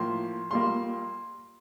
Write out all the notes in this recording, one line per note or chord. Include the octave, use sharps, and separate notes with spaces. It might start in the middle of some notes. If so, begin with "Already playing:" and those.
Already playing: A2 F3 A#3 C6
A#2 G3 A#3 C6